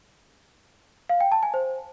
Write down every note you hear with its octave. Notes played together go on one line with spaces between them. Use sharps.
F5
G5
A5
G#5
C5